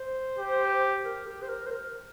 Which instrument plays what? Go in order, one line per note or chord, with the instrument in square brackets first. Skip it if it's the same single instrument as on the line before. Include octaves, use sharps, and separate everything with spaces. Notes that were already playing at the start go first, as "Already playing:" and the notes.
Already playing: [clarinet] C5
[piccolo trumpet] G4
[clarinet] A#4
G4
C5
A#4
C5
A#4